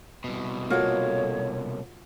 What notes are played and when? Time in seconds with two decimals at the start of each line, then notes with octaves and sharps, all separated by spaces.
0.24 C2 B2
0.70 A#3 C#4 F4 F#4 A4 C#5